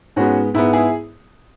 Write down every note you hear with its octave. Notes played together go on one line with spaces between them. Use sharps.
G#2 G#3 B3 C#4 F#4
G#2 G#3 B3 E4
E4 G#4